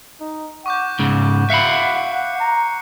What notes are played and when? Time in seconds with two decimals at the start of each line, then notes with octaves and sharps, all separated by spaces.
0.20 D#4
0.66 F#5 C#6 D6 G6
0.99 G#2 C#3
1.50 E5 F5 B5 F#6 C7 C#7
2.40 A#5